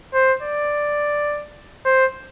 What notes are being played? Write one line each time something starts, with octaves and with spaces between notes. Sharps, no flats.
C5
D5
C5